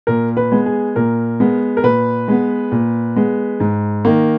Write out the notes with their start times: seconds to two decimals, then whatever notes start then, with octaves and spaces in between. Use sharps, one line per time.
0.07 A#2 A#4
0.37 B4
0.52 G#3 B3
0.66 G#4
0.96 A#2 A#4
1.40 G#3 B3
1.77 A#4
1.83 A#2 B4
2.28 G#3 B3
2.72 A#2
3.16 G#3 B3
3.60 G#2
4.05 D#3 A#3